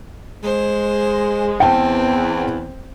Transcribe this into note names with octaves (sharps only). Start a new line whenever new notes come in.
G#3 C5
E2 C4 G5 A5